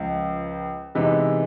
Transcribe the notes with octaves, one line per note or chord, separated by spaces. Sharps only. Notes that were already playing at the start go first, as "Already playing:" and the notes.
Already playing: C#2 C#3 F3
C3 E3 G#3 B3 D#4